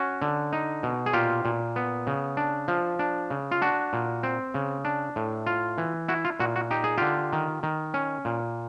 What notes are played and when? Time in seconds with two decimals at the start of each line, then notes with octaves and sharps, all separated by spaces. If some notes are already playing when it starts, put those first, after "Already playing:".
Already playing: C#4 F#4
0.22 D3
0.53 D#4
0.83 B2
1.06 G#4
1.13 A#2 F4 G4
1.45 A#2
1.76 B3
2.07 C#3
2.37 D4
2.68 F3
2.99 D4
3.30 C#3
3.51 F4
3.61 D4 F#4
3.93 A#2
4.23 C4
4.54 C#3
4.85 D4
5.16 A2
5.47 F4
5.78 E3
6.08 E4 F#4
6.25 F4
6.40 A#2 F#4
6.56 F#4
6.71 D#4 G4
6.84 G#4
6.98 D3 F4 G4
7.33 D#3
7.63 D#3
7.94 C#4
8.25 A#2